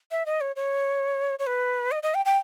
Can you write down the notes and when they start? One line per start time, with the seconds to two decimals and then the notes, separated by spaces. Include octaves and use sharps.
0.11 E5
0.26 D#5
0.41 C#5
0.56 C#5
1.39 C#5
1.47 B4
1.92 D#5
2.03 D#5
2.15 G5
2.25 G5